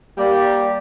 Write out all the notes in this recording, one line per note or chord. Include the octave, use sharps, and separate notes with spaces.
G3 A#3 G4 D5